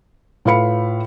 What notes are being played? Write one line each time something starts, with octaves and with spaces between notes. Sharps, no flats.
A2 F4 B4 F5 B5 C#7